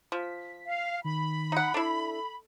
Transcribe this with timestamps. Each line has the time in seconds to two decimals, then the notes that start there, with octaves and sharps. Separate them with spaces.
0.12 F3 B6
0.66 F5
1.05 D#3 B5
1.52 D#4 F#5
1.74 D4 E4 A4